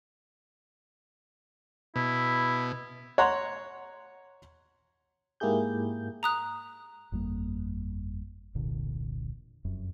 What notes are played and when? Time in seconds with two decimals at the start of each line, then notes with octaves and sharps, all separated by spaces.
1.96 B2 E4
3.18 C#5 F#5 A#5 C6
5.40 G#2 A#3 E4 G4 G#4 G6
6.23 A#5 D#6 F#6
7.12 G1 F2 G3 A#3
8.55 E1 C2 A#2 D3
9.65 F1 F#2